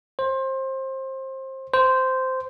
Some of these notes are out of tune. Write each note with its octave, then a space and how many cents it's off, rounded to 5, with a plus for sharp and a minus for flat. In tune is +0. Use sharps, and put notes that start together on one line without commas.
C5 +25
C5 -10